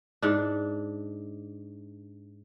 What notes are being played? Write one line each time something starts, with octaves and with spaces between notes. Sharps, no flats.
G#2 D4